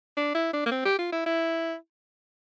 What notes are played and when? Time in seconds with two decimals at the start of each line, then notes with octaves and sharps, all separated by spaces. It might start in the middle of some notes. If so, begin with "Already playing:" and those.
0.17 D4
0.35 E4
0.53 D4
0.66 A#3
0.71 C4
0.85 G4
0.99 F4
1.12 E4
1.26 E4